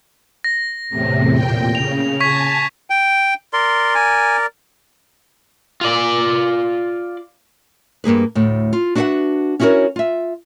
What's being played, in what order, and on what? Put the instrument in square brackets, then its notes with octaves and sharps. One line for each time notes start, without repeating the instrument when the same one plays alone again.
[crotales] A#6
[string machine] E2 A2 C3
A#2 G5
[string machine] C#3 [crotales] F7
[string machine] G#5 A5 [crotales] C#6 G#6 B6
[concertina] G5
[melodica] A#4 D5 [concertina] C6
[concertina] G#5
[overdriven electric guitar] F4 D5
[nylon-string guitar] G2 A#3 G#4 B4
D2 A2
F4
D4 F#4 B4 D5 E5 F#5
C#4 E4 F#4 G#4 A#4 C#5
F4 E5